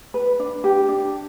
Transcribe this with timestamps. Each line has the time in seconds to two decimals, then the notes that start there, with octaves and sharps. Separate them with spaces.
0.14 B4
0.40 D4
0.64 G4
0.89 D4